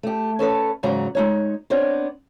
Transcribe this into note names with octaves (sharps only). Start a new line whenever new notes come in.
A3 G4
C#4 A4 B4 C#5
E2 G#2 C#3 F#3 A#5
G#3 D#4 C#5
B3 C4 D4 C#5